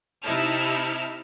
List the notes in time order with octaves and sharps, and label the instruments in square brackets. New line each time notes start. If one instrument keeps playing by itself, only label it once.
[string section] C3 D#4 E4 E5 A5 F6